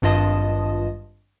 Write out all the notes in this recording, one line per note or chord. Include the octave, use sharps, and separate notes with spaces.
G#1 G2 F4 D#5 A5 D#6